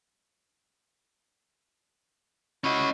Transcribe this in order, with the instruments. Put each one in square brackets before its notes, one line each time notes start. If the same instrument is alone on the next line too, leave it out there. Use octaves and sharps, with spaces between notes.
[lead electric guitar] C#4 D#5 [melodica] E4 F#4